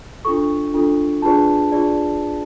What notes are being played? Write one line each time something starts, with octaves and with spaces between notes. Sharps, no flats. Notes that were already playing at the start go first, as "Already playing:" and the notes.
D4 F4 A4 C#6
D4 F4 A4
D4 F4 G#4 B4 D5 A5
D4 F4 G#4 D5